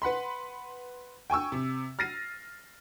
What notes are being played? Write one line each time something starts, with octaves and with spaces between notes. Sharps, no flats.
B4 F#5 B5 C6
G5 G#5 C#6 E6
C3
F6 A6 A#6 C7 D#7